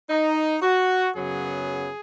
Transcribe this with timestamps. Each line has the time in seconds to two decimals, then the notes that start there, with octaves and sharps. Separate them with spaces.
0.10 D#4
0.62 F#4
1.15 F#2 C#3 F#3 B3 G#4